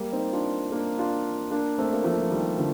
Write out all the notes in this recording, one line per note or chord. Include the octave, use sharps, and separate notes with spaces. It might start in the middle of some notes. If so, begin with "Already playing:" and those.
Already playing: G3 A#3
C4 D#4
D4 F4
A#3 D4
D4 F4
A#3 D4
A3 C4
A#3
F3 A3
F3
D#3 G3
D3 F3